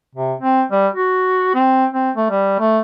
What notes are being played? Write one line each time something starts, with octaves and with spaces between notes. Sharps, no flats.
C3
C4
G3
F#4
C4
C4
A3
G3
A3